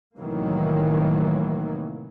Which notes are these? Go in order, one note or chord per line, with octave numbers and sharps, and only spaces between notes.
C2 A2 D#3 E3 F#3 A#3